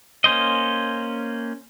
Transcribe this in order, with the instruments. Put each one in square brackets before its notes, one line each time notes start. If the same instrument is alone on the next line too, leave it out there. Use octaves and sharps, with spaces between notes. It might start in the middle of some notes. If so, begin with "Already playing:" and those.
[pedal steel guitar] A#3 C#4 C5 D#5